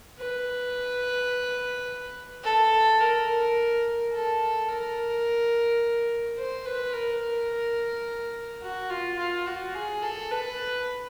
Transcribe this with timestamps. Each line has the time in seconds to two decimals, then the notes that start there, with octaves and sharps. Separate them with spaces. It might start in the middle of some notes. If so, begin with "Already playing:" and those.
0.19 B4
2.44 A4
3.00 A#4
4.13 A4
4.69 A#4
6.38 C5
6.66 B4
6.93 A#4
8.62 F#4
8.90 F4
9.19 F4
9.47 F#4
9.75 G#4
10.02 A4
10.31 B4